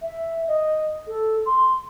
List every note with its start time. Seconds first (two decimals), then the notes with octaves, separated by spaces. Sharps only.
0.02 E5
0.48 D#5
1.07 A4
1.46 C6